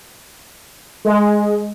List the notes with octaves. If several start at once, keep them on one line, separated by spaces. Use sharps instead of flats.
G#3